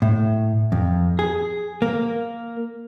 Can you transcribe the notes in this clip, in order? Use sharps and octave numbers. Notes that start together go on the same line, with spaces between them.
A2
F2
G#4
A#3